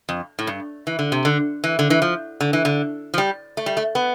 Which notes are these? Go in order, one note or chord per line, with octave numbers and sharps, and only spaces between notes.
F2
A2
G2
E3
D3
C3
D3
E3
D3
E3
F3
D3
E3
D3
F3
G3
A3
G3
A3
B3